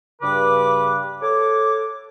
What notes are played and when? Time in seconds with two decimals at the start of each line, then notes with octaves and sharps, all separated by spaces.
0.22 G2 C#3 B4 D6
1.21 A4 C#5 D6